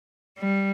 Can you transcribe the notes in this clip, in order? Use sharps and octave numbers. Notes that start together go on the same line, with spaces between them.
G3